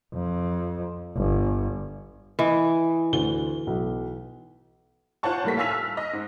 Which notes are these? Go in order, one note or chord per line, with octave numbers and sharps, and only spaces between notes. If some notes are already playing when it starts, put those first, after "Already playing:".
F2
G1
E3 D#5
D2 G7
B1
F4 C5 C#5 F#5 A5 C#6
A2 G3 A#3 A4 B6
F5 G#5 A5 E6 B6 F7
F6
D#5
G#2